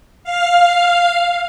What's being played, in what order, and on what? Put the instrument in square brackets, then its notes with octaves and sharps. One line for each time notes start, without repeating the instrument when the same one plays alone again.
[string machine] F5